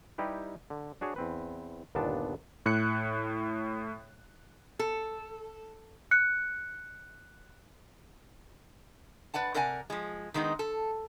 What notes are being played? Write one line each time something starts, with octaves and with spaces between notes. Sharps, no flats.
G3 D#4 E4 G4 B4
D3
D4 F#4 G#4 C#5
E2 C4 B4
G1 D#2 A#2 B3 D4 A5
A2 F#6 C#7
A4
F#6 C#7
B4 D5 F#5 A5
C3 A#4 D5 F#5 G#5
F3 G#3
D#3 G#3 B3 D#4
A4